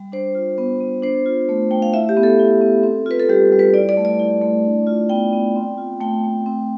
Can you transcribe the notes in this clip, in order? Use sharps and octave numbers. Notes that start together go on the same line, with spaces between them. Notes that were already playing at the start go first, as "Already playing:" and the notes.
Already playing: G3
D4 C5
F4
B3
B3
D4 C5
F4
A3
A3 G5
F5
E4 E5
G4
B3
A4
E4
B3
C4
F4 B4
A4
G3 G4
G3
B4
E4 D5
D5
A3
D5
E4
A3
D4
F4
B3 G5
B3
C4
F4
A3 G5
A3
C4